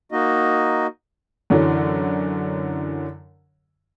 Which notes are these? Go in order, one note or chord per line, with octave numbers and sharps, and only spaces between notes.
A#3 D#4 F#4 D#5
F#2 D3 E3 F#3